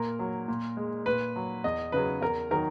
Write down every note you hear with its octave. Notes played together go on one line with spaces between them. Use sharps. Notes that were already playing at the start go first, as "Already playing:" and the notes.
Already playing: A#2 A#4
F#3
A#2
G#3
A#2 B4
F#3
E2 D#5
C#3 F#3 B4
E2 A#4
D#3 F#3 A#4